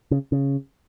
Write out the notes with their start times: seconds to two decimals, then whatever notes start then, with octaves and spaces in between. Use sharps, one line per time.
0.11 C#3
0.32 C#3